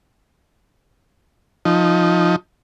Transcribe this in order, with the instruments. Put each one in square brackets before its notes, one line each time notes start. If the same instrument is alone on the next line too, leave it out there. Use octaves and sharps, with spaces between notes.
[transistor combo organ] F3 D#4